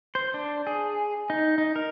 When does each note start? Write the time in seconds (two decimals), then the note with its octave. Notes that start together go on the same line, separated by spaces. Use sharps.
0.15 C5
0.34 D4
0.67 G#4
1.30 D#4
1.58 D#4
1.76 A#4